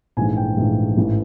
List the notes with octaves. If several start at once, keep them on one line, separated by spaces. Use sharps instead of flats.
A#1 G#2 E3 A3 G#5
G5
A#1 G#2 E3 A3
A1 G#2 E3 A3